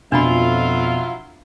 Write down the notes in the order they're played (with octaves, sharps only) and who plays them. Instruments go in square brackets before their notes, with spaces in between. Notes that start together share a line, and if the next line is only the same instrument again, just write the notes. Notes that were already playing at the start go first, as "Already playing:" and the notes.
[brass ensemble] F2 [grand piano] B2 [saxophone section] F#3 E4 F4 [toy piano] D4 B5